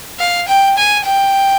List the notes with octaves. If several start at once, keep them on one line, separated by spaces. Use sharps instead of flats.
F5
G5
G#5
G5